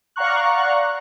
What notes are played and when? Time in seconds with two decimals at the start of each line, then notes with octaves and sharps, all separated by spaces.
0.16 D5 F5 F#5 A#5 C#6 F#6